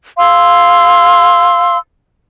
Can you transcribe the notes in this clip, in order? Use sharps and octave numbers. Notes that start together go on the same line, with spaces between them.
F5 C6 E6